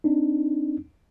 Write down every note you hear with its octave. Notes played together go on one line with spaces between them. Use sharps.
C4 D4 D#4